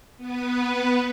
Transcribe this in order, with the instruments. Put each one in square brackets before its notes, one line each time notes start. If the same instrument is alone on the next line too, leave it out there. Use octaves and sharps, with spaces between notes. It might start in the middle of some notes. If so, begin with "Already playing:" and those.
[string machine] B3 B4